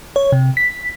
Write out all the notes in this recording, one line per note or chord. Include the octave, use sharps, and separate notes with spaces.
C#5
C3
B6